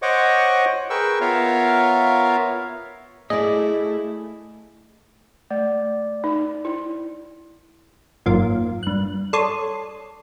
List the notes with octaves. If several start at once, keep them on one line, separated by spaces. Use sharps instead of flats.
C5 C#5 D#5 F#5 C#6 D6
G#4 A#4 B4 G5 C#6 E6
B3 F4 A#4 C#5 E5 F5
A3 E4 G#4 D5 D#5
A3 D5
D#4
E4
G#1 F#2 A#3 F4
G2 F#6
A4 C#5 D5 C6 D#6